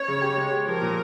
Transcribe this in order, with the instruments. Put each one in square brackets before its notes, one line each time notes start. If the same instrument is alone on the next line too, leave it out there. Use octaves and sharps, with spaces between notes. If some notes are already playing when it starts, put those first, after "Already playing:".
Already playing: [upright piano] C#4 [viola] C#5
[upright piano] C#3
G4
G#3
G4
[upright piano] F3 [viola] A#4
[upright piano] A#2